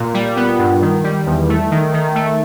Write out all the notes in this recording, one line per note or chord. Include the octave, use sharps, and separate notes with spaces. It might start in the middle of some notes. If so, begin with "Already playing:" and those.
Already playing: A#2
G3
B3
G2
D#3
G3
E2
A3
D#3
D#3
A3